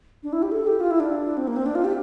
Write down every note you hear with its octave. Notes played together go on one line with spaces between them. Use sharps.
D4
E4
G4
A4
G4
F4
E4
D4
C4
A#3
C4
D4
F4
G4